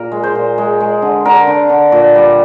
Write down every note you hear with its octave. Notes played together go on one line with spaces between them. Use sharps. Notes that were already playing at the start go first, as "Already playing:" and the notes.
Already playing: A#2 A#4
G#3
C5
A#2
G#3
G#3
D3
D3 A#4
D3
D3
A#2
G3